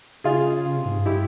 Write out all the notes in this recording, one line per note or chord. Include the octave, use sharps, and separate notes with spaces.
C#3 F4 G#4
C#3
C3
G#2
G2
E4 G4